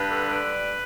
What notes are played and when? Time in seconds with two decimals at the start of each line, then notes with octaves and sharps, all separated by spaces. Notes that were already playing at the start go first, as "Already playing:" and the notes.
Already playing: G2 B4
0.10 D3
0.27 G3